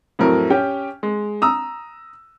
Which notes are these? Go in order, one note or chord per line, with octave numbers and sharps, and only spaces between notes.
F2 A2 F#3 A#4
C#4 G4 G5
G#3
A#5 D#6 E6